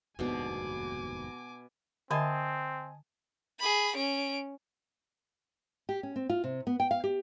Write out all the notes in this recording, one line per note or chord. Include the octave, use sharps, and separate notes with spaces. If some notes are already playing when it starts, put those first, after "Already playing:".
F1 D#2 G#2 B2 B3 D4 G#5 D6
D3 C4 D#5 E5 G#5 A5
G#4 B5
C#4 D7
G4
C#4
C4
F4
C3
B3
G5
F5
G4